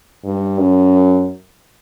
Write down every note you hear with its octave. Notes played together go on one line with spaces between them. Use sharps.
G2
F#2